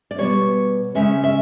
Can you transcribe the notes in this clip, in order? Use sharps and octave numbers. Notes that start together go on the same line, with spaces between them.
D5
B2 G3 B3 C#5
C#3 F3 G#3 C#4 E5
E5